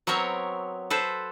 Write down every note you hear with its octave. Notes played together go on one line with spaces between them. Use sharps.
F#3 B3 C4 A#4 C#5
A4 B4 C5